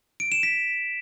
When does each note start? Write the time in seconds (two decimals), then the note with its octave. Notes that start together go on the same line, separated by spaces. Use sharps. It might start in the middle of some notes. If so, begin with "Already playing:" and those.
0.20 D7
0.32 E7
0.43 B6